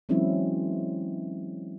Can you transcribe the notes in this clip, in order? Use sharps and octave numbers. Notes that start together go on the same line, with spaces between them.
E3 F#3 G#3 C4 C#4 E4